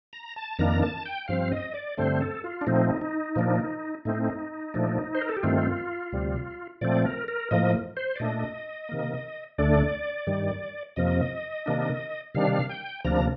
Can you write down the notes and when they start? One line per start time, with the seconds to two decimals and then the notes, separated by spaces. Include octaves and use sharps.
0.13 A#5
0.36 A5
0.59 F2 D#3 A#3 D4 A#5
0.82 A5
1.05 G5
1.28 G2 F3 C4 F5
1.52 D#5
1.74 D5
1.97 G2 D3 A3 C4 C5
2.21 A4
2.44 F4
2.61 D4
2.67 A#2 F3 A3 C4 D#4
3.01 D#4
3.36 A#2 F3 A#3 D4
4.05 A2 A3 C4 D#4
4.74 A#2 F3 A3 D4
5.15 C5
5.21 A#4
5.29 A4
5.37 G4
5.43 G2 D#3 A3 C4 F4
6.12 D2 C3 G3
6.81 A#2 F3 A3 C4 D5
7.05 A#4
7.28 A#4
7.51 A2 F3 A#3 D#5
7.97 C5
8.16 D5
8.20 A#2 A3 D4 D#5
8.89 C3 D#3 A#3
9.58 D2 D3 A3 D4 D5
10.27 G2 D#3 G3
10.96 F2 C3 F3 A#3 D#5
11.66 C3 D#3 A#3 D4
12.34 C3 D#3 G3 D4 F5
12.69 G5
13.05 D2 C3 F3 A#3 D4 A#5